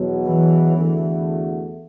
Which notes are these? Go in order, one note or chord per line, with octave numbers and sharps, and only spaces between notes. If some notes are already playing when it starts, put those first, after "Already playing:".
Already playing: E2 B2 F#3
E3
E2 D3 A3 F#4